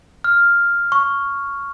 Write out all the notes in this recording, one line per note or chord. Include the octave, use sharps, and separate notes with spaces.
F6
C#6